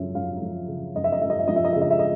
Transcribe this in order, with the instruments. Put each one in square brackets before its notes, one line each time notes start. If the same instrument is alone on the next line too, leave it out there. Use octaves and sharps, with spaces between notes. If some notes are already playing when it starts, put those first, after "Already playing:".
Already playing: [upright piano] F#2 C#3 F3 E5
F#2 F5
F3
C#3
F#2 D#5
E5
D#5
F#2 E5
D#5
E5
F3 D#5
E5
D#5
C#3 E5
D#5
E5
D#5